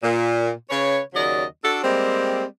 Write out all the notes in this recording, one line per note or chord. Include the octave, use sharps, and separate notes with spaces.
A#2
C#3 B4 C#5
D#2 C#3 F#3 D5 D#5
D4 F#4 A4
G3 G#3 A#3 C4